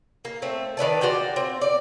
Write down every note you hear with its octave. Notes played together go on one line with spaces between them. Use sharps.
A#3
A3 C4
D#3 B4 D5 A5
F4 F#4 D5 G5
C4
D5